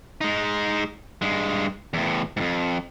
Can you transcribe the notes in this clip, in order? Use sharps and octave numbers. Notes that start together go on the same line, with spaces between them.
G#3 D#4
G2 G#3
E2 A2
F2 G#2